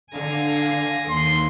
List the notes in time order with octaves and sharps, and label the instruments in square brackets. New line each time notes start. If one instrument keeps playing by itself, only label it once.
[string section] D3 F5 [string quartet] G#5 A#6
[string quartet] D#2 [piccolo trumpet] C6